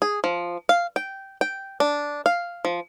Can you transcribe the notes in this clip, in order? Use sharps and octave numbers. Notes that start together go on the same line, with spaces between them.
G#4
F3
F5
G5
G5
D4
F5
F3